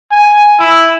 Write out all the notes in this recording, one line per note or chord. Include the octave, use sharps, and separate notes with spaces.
G#5
E4